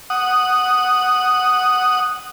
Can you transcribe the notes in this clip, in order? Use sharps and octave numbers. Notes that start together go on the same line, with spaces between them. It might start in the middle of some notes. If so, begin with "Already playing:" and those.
F#5 D#6